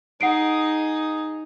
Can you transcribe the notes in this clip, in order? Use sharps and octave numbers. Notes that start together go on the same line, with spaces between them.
D#4 G#4 F#5 C7 D7